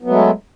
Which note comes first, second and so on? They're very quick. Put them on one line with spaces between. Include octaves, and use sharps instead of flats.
B3 F#3 A3 G#3